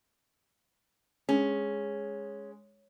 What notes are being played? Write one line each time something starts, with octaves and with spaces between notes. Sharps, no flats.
G#3 C#4